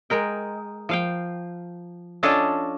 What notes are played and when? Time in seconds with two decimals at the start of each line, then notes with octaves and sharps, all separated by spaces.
0.10 G#3 A#4 G5
0.89 F3 F5 G5
2.23 C#4 D4 F4 A4 C#5 D#5